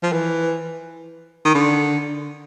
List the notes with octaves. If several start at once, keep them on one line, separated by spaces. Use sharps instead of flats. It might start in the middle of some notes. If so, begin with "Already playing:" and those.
F3
E3
D#3
D3